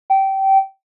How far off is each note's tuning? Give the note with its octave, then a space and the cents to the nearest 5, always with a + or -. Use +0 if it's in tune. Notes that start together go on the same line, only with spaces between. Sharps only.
G5 -20